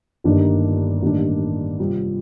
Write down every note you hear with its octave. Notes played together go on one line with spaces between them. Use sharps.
G1 G2 D#3 A#3 D4
A1 G2 D#3 A#3 D4
C3 G3 C4 F4